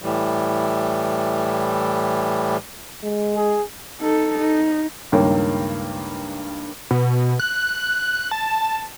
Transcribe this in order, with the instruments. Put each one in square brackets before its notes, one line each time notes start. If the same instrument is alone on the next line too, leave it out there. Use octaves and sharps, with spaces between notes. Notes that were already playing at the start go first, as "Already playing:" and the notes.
[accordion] A2 E3 G3
[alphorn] G#3
[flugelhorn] G#4
[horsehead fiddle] D#4 A4
D#4
[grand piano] C#2 G2 D#3 A#3 C#5 G5
[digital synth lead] B2
F#6
A5